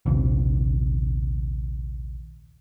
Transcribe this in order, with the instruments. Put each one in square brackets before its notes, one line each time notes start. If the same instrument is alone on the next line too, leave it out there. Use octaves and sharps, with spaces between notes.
[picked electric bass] A#1 D#2 C3